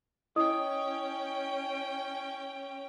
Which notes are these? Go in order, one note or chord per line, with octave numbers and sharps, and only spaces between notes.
C#4 E4 D#5 G5 D#6